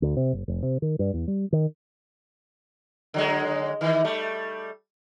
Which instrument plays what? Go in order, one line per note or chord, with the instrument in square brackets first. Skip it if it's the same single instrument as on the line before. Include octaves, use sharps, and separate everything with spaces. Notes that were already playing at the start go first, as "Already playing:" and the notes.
[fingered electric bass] D2
C3
F#1
F1
C3
D#3
G2
E2
G3
D#3
[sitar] D3 F#3 G#3
D#3 E3
G3 A3